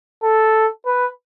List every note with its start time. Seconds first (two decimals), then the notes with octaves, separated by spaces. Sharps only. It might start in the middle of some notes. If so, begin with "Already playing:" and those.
0.23 A4
0.85 B4